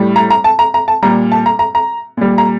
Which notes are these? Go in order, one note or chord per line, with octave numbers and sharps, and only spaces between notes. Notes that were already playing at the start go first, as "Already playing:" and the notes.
Already playing: A2 G3
A#5
A#5
A5
A#5
A#5
A5
A#2 G3 A#5
A5
A#5
A#5
A#5
A#2 G3
A#5